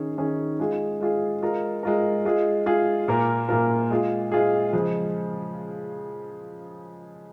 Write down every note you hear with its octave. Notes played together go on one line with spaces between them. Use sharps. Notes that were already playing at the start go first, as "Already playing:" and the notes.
Already playing: D#3 C#4 G#4
D#3 C#4 G#4
G#3 F4 G#4
G#3 F4 G#4
G#3 F4 A#4
G#3 F4 A#4
G#3 F4 G#4
G#3 F4 G#4
A#2 A#3 F4 A#4
A#2 A#3 F4 A#4
G#3 F4 G#4
G#3 F4 G#4
C#3 F3 G#3